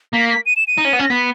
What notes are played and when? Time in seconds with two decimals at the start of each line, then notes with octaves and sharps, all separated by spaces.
0.14 A#3 B6
0.30 B6
0.46 D#7
0.57 E7
0.68 D#7
0.78 D#4
0.85 C#4
0.93 B3
0.99 C#4
1.04 A#6
1.10 B3 B6